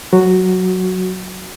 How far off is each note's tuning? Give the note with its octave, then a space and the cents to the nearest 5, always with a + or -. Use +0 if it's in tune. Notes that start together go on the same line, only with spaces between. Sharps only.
F#3 +0 F#4 +0